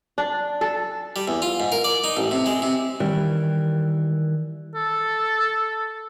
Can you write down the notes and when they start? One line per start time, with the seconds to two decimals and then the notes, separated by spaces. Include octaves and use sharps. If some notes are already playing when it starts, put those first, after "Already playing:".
0.18 D4
0.61 A4
1.16 G3
1.28 E2
1.42 F4
1.60 G#2
1.72 A#4
1.84 D5
2.04 D#4
2.17 A1
2.31 C3
2.46 G#3
2.62 C3
3.00 D#3 E3 G3 A#4
4.75 A4